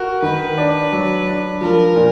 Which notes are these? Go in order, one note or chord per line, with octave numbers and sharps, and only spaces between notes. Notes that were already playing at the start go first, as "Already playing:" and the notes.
Already playing: F#4 A#4
D#3 B4
D4
F#3
D4
F3 A#4
A#2